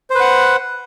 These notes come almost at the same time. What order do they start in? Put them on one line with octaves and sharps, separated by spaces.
C5 B4 F#5